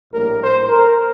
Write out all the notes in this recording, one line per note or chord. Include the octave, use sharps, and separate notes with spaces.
A#1 A2 G3 A#3 A#4
C5
A#4